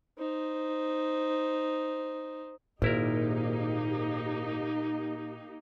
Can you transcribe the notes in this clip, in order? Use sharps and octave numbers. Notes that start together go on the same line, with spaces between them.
D#4 C5
G#1 A#2 A#3 D#4 E4 G4 A#4